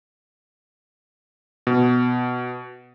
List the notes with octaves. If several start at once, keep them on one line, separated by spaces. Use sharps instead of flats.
B2